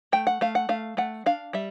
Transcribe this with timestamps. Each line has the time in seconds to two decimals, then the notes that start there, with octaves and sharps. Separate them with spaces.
0.12 A3 G5
0.27 F#5
0.41 A3 F5
0.55 F#5
0.69 A3 F5
0.97 A3 F#5
1.26 D4 F5
1.53 G3 E5